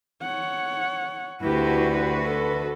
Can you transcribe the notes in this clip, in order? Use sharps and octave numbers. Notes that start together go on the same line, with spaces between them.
C#5 F#5
D2 E4 F#4 G4 B4
A4